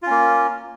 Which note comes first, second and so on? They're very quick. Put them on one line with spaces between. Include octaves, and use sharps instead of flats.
F4 C#4 A#3